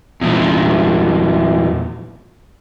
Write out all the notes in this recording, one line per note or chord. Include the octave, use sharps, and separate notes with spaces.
E2 A#2